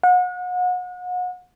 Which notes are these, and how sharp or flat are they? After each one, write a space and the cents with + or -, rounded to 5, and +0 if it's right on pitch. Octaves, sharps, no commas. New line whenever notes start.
F#5 -35